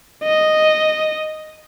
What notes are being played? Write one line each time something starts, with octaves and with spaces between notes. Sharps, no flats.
D#5